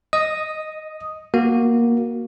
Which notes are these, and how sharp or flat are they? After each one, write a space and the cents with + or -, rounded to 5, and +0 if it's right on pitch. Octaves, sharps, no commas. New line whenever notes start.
D#5 +0 D#6 +0
A#3 +10 F#4 +0